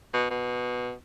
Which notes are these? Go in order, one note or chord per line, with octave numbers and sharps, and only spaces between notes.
B2
B2